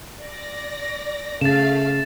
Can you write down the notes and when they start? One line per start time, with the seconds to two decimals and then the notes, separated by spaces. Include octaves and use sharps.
0.21 D5 A#6
1.41 C#3 A3 F5 A6 E7